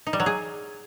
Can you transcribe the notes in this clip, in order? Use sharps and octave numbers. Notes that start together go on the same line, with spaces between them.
D#4
G3
F#3
G#4